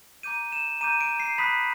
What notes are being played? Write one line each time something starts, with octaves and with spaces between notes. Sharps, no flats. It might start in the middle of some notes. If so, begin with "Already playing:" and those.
A#5 D6 G6 D#7
E7
A#5 D6 G6 D#7
D7
C7
B5 D#6 F#6 B6